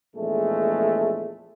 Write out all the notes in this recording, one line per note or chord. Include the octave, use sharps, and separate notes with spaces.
A#1 E2 G#3 A3